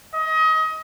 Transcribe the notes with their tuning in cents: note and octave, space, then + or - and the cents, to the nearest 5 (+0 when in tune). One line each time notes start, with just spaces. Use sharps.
D#5 +25